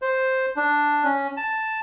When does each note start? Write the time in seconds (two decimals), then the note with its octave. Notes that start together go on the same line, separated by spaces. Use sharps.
0.02 C5
0.56 D4
1.04 C#4
1.37 A5